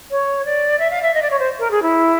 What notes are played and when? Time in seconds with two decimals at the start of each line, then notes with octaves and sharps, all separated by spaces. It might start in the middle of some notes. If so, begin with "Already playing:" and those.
0.10 C#5
0.45 D5
0.79 E5
0.90 F5
1.02 E5
1.14 D#5
1.22 D5
1.30 C#5
1.39 C5
1.59 A#4
1.71 G#4
1.82 E4